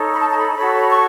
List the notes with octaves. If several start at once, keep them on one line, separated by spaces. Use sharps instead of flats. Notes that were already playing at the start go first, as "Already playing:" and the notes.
Already playing: D#4 A4 C#5
B5
A5
A5
B5
F#4 A4 C#5 B5
C#6